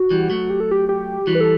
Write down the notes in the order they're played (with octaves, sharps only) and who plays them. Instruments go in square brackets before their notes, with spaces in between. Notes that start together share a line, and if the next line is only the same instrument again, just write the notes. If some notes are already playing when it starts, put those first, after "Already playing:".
Already playing: [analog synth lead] F#4
[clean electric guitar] E3 G3
F#3 A3
[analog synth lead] G4
A4
G4
G4
[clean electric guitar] E3 G3 [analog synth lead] F#4
[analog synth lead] B4
A4